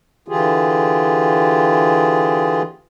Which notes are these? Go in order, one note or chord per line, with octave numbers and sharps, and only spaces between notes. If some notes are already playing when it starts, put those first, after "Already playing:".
D3 E3 F4 G4 G#4